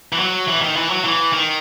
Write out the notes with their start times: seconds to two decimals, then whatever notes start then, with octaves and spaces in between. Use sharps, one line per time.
0.13 E3
0.19 F#3
0.48 E3
0.61 D#3
0.76 E3
0.90 F#3
1.04 E3
1.33 D#3